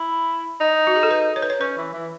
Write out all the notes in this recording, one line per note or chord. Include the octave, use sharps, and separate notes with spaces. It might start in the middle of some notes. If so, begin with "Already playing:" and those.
Already playing: E4
D#4
F#4
G#4
A4
B4
C#5
B4
C#5
C#4 B4
E3
E3